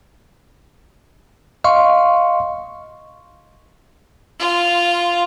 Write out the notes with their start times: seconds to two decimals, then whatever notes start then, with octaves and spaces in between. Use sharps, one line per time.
1.64 D#5 F5 C6 C#6
4.40 F4